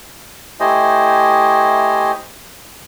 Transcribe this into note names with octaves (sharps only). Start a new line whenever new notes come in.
A3 E4 G4 C5 D#5 G#5